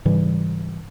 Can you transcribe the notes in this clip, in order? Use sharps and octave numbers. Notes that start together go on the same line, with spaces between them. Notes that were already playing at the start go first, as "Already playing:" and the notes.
G#2 C#3 E3 G3